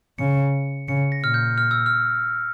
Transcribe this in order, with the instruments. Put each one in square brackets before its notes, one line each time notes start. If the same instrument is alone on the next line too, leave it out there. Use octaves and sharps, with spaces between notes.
[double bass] C#3 [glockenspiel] C#7
[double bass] C#3 [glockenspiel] C#7
[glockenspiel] A#6
[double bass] A#2 [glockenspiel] F6
[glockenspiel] G6
F6
E6
F6